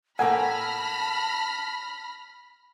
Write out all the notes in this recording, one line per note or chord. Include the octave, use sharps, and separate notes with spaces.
A2 A#3 F#5 G#5 A5 B5 F6 A#6